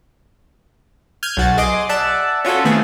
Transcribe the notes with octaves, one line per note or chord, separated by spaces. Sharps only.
F6 G6 G#6 D#7
B1 F#4 A6
G#4 D#5 C6 D6
D5 E5 F#5 A5
C#4 F4 F#4 A4
D#3 A3 B3 C4 G#4